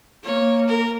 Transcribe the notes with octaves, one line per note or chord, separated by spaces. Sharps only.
A#3 C#5
A#4